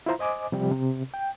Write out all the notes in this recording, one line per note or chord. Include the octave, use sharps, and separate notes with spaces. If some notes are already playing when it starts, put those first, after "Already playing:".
E4 F4 C5 A#5
C5 D#5 G#5 D6
C3 F3 G3 G4
C3
G5